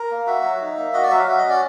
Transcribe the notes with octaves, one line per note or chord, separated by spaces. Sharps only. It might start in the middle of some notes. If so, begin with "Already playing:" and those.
Already playing: A#4
A#3
F#4 E5
F#3
D#4
A#3
F#4 D#5
D5
F#3 E5
F5
F#4 E5
D#5
C#4
D5